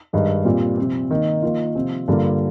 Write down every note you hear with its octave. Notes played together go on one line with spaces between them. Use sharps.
G2 D#3 G#3 D#4
A#2 G3 C4 F4
C3 F3 C4
D#3 A#3 D#4
D#3 A#3 F4
C3 F3 C4
G2 D3 G3 A#3 F4